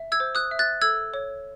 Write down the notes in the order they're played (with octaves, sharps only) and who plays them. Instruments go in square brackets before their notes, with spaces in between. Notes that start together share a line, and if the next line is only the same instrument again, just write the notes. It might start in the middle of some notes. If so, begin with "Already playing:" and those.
Already playing: [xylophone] E5
E6 G#6
C5
D#6 F#6
E5
F#6 A6
A4 E6 G#6
C#5